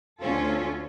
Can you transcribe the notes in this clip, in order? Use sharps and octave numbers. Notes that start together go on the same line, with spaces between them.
D2 C#4 F4 A4